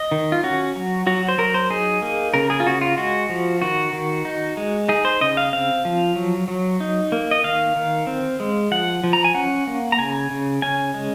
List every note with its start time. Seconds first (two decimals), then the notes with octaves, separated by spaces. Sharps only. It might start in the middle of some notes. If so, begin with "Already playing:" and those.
Already playing: D#5
0.11 D#3
0.32 F4
0.43 C#4 F#4
0.75 F#3
1.07 F#3 F#4
1.28 C5
1.38 F#3 A#4
1.54 C5
1.70 D#4 G#4
2.02 A#3
2.34 C#3 A#4
2.50 G#4
2.60 F4
2.66 C#3 F#4
2.81 F4
2.97 G#3 F#4
3.29 F3
3.62 D#3 F#4
3.93 D#3
4.25 D#4
4.57 G#3
4.89 D#4 G#4
5.05 C5
5.21 C#3 D#5
5.37 F5
5.53 C4 F5
5.85 F3
6.16 F#3
6.48 F#3
6.80 D#4
7.12 A#3
7.31 D#5
7.44 D#3 F5
7.76 D#3
8.07 C4
8.40 G#3
8.71 F3 F#5
9.04 F3
9.13 A#5
9.24 G#5
9.35 C#4 F#5
9.67 A#3
9.92 A#5
9.99 C#3 G#5
10.31 C#3
10.62 C#4 G#5
10.94 G#3